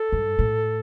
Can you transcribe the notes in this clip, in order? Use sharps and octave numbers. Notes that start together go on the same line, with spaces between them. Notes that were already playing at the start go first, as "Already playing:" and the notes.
Already playing: A4
G2
A2